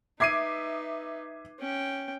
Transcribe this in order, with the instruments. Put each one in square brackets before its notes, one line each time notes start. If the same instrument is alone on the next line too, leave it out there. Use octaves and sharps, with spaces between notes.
[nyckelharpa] D#4 B4 [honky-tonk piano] E5 D6 D#6 [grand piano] G#6 C7 D#7
[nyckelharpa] C#4 G5